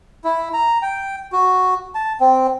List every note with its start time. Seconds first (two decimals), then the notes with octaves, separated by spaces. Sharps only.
0.24 E4
0.53 A#5
0.82 G5
1.32 F#4
1.95 A5
2.20 C4